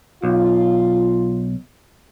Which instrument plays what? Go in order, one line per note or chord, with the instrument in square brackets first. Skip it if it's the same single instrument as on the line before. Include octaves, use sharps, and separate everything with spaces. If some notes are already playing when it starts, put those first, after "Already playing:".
[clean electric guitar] B1 [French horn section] F4